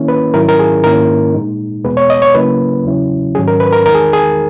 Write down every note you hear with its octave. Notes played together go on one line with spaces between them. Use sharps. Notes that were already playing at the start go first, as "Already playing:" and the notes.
Already playing: D#3 A#3 C#4 E4
B4
G#2 D#3 F#3 C#4 E4 A#4
A#4
G#4
G#2 D#3 A#3 C#4 E4 A#4
A#2 G#3 D#4
E2 B2 G#3 B3 B4
C#5
D#5
C#5
C#3 F#3 A#3 C#4 E4 B4
E2 C#3 F#3 C#4 E4
G#2 D#3 F#3 C#4 G#4
A#4
B4
A#4
E2 D#3 G#3 D#4 A#4
G#4
G#4